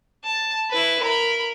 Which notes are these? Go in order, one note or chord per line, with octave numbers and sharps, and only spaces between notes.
A5
E4 B4
A#4 B5